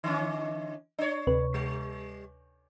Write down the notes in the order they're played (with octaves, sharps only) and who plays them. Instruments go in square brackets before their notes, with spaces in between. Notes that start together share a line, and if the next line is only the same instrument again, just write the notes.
[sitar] D3 E3 C#4
D4 C#5
[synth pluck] D2 C3 B4
[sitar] G3